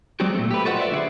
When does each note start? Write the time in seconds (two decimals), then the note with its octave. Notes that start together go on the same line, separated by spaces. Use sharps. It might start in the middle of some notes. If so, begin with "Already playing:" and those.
0.20 F#3 G#3 C4 D4 F#4 G4
0.35 A#2 A3
0.51 G4 B4
0.65 F4 F#4 A4 C5 D#5 F#5
0.77 B4 D5 E5
0.91 D3 F#4 G#4